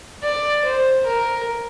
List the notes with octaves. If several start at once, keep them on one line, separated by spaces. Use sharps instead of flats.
D5
C5
A#4